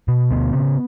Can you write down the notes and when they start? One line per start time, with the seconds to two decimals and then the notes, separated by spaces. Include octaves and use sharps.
0.08 B2
0.31 D2 B3
0.53 C#3